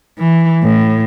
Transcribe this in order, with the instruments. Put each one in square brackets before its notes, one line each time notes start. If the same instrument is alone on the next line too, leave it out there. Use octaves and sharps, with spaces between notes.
[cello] E3
A2